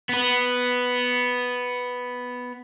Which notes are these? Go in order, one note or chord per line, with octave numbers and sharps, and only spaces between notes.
B3 B4